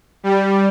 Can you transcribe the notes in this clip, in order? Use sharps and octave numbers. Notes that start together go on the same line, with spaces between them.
G3